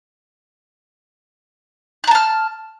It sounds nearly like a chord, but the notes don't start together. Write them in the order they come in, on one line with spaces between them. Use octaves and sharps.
F#6 A#5 A5 F6